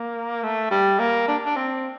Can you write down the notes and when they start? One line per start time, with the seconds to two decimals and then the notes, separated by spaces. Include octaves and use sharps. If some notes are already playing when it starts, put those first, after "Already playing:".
Already playing: A#3
0.43 A3
0.71 G3
1.00 A#3
1.28 D4
1.46 D4
1.56 C4